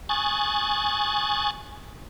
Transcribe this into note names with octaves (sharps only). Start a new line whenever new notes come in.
G#5 C#6 D#6 F#6 A6